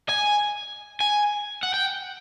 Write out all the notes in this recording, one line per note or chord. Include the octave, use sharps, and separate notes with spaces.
G#5
G#5
F#5
G5